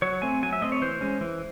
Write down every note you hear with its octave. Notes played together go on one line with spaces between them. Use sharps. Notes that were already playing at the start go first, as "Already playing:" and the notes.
F#3 C#5
A3 C4 G#5
F#3 G#5
E5
A3 C4 D#5
C#5
E3 C5
G#3 C#4
E3